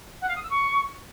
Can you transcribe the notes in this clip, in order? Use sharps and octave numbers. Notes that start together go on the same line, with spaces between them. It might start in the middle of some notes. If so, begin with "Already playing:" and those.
F#5
F5
D#6
E6
C#6